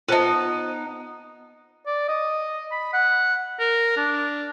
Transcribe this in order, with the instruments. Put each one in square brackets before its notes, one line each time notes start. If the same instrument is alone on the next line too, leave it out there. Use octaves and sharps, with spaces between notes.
[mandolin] B3 D#4 [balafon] F4 C5 A5
[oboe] D5
D#5
B5
F#5
A#4
D4